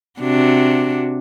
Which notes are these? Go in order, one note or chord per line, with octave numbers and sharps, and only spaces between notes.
C3 D4 F#4